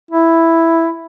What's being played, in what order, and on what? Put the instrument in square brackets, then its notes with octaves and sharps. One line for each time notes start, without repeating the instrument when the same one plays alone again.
[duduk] E4